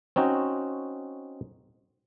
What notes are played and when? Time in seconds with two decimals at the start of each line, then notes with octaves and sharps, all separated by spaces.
0.16 C4 C#4 D#4 F#4